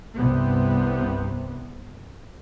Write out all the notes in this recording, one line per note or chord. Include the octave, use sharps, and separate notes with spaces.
C2 G2 C3 B3